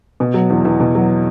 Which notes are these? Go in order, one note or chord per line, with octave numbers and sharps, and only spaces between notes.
B2
F#3
E2
E2
B2
F#3